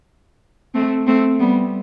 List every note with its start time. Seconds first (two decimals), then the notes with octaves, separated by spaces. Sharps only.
0.74 A3 C4
1.07 A3 C4
1.40 G3 B3